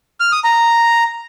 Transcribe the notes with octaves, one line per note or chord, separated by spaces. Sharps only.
F6
D#6
A#5